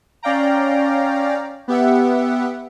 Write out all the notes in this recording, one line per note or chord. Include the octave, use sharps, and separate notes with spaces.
C#4 D5 F5 G5 A#5
B3 G4 E5 F#5